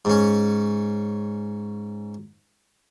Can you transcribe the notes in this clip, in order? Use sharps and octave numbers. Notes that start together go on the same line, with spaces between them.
G#2 C#4